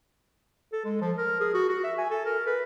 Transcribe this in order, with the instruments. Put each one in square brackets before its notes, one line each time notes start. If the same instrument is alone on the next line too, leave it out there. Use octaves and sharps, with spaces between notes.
[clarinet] A4
G#3
F3
A#4
G#4
F#4
F#4
E5
G#5
A4
A#4
B4